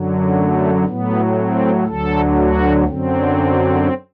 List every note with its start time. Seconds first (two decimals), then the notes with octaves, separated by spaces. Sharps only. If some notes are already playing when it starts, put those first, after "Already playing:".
Already playing: F#2 D3 F#3
0.35 A3
0.85 A2 F#3 B3
1.35 C4
1.86 D2 D3 F#3 A4
2.37 F#4
2.87 F#2 D3 F#3 C4